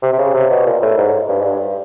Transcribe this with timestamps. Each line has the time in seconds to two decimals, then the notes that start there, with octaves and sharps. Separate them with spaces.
0.02 C3
0.13 C3
0.18 C#3
0.34 C3
0.50 B2
0.66 A#2
0.82 A2
0.98 G#2
1.29 G2
1.41 G#2
1.45 G2